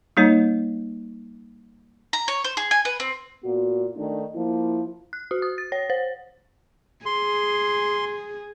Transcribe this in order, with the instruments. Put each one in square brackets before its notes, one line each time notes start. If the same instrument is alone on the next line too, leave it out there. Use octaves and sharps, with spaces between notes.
[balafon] G3 A#3 D#4 C#5
[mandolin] A#5
C#5
C5
G#4
G#5
B4
C4
[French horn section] A#2 B3 F#4
D#3 A3 D4 D#4
F3 A#3 E4
[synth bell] F#6
F#4
D#6
A6
C#5
C5
[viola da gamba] G#4 [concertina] C6